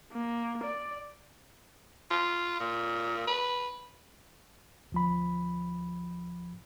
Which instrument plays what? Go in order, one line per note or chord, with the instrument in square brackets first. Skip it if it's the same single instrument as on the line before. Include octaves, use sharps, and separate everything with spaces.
[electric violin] A#3
D5
[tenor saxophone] F4
A#2
B4
[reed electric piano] D2 F3 B5